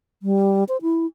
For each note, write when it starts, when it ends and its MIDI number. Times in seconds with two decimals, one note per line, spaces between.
0.23 0.64 55
0.69 0.77 72
0.82 1.06 64